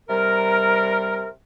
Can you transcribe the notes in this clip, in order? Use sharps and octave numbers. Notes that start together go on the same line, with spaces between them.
C3 G3 A#4